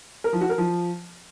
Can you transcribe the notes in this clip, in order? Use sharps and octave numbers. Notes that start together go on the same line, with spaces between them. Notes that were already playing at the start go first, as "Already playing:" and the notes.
A#4
F3
F#4
A#4
F3